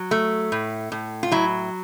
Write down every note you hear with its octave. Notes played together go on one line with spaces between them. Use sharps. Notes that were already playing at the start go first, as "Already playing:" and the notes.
Already playing: F#3
A3
A2
A2
F4
F#3 E4